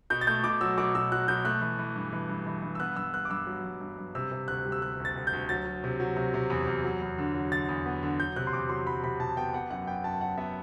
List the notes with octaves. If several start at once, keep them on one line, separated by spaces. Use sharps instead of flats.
B2 G6
A6
A3 G6
B2 D6
F#3 E6
B2 D6
B2 E6
F#3 F#6
B2 G6
A3 F#6
E3
E3
G2
E3
G2
E3
G2
E6
B3 F#6
G2 E6
B3 F#6
D6
G2 E6
F#3
G2
G2
G2
C3 E6
C3
D2 F#6
G3
E6
G3 F#6
D2
A6
D2
G6
D2
F#3 A6
F#3
C3
F#3
C3
C3
E2
E2
F#3
E2
D3
F#3
D3 A6
E2
B3
D3
F#3 G6
C3 F#6
C6
E2 D6
F#3 C6
F#3 B5
C3 B5
C3 A5
B3 G5
B3 F#5
F#2 F#5
B3 G5
F#2 A5
F#3 F#5
B3 E5